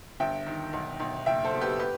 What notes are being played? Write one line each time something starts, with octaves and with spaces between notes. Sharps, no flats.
G1 E5 G5
D#3
B1
B1
F#1 E5 G5
A4 C5
B2
G4 B4
G4 B4